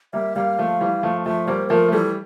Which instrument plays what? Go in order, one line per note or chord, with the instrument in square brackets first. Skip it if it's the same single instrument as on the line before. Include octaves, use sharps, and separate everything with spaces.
[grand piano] G3 A#3 [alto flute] E5
[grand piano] G3 A#3 [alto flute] F5
[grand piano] F3 A3
E3 G3
F3 A3
[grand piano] F3 A3 [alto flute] E5
[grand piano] G3 A#3 [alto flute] C5
[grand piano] F3 A3 [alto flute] A#4
[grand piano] A3
[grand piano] E3 G3 [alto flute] A4